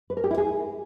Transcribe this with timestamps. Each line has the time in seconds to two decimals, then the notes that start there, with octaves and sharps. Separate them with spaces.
0.10 B4
0.17 A#4
0.24 G4
0.31 E4
0.38 G#4